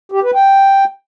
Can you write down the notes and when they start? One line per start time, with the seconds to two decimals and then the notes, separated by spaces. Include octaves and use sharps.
0.12 G4
0.23 B4
0.35 G5